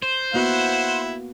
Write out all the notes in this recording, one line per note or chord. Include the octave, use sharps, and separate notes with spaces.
C5
A#3 B3 E4 F#4 F#5